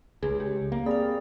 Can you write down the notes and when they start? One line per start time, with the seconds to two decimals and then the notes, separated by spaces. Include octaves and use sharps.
0.23 C#2 G#4
0.40 G4
0.72 A#3
0.86 C4 G#4 D5 F5 B5